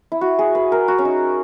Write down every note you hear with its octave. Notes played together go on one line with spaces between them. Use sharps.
E4
F#4
G#4
B4
A#4
F#4
C#4
D#4